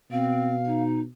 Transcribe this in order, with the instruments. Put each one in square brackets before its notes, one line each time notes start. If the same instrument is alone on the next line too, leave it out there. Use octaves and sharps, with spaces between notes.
[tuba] B2 [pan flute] C4 [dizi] F5
[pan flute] D#4